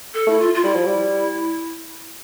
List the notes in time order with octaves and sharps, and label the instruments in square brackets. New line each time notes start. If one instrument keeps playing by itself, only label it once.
[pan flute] A4
[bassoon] A3 [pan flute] E4
[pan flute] F4
F4
[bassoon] G3 [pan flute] E4
[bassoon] F3
G3